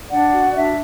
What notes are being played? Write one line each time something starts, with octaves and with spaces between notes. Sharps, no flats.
D4 D5 F#5
F#4
D4 E5